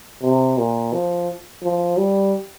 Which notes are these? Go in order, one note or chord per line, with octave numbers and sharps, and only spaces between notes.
C3
A#2
F3
F3
G3